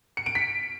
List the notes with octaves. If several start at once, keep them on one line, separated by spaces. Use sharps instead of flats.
C#7
D7
B6